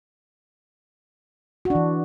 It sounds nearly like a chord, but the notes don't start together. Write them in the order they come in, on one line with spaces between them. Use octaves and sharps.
F#4 D4 E3